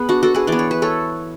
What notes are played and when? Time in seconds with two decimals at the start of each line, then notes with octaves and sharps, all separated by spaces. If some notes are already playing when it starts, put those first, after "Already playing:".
Already playing: B3 G#4
0.09 D4 F#4
0.23 F#4 A4
0.34 G#4 B4
0.47 E3 B3 D5
0.59 C#5
0.71 B4
0.82 A4 C#5